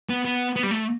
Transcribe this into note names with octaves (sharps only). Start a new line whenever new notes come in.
B3
B3
B3
G3
A3